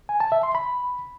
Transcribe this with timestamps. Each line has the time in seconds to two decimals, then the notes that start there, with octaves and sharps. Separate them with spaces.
0.09 G#5
0.20 A5
0.32 E5
0.43 C6
0.55 B5